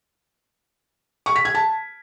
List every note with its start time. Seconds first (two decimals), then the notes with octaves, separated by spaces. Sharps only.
1.26 C#6
1.36 B6
1.45 G#6
1.55 A5